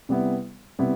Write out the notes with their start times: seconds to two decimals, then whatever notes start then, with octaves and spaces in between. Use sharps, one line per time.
0.09 C3 G3 B3 E4
0.79 C3 G3 B3 E4